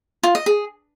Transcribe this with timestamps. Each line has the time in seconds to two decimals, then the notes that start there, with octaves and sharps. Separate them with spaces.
0.23 F4
0.35 D#5
0.46 G#4